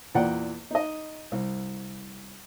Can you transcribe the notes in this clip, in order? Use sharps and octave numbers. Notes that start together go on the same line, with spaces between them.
E2 A#2 A#3 D5 F#5 G5
D#4 D#5
C2